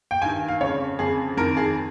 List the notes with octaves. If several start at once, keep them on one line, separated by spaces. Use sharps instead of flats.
G5
G2 D#3 G#5
F5
F2 C#3 C#5
F2 C#3 G#4
F2 D#3 A#4
G#4